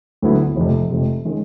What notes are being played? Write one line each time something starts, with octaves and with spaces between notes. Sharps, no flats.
D2 D3 F#3 B3 E4
F1 F2 C3
F1 F2 C3
D#3 G#3 C#4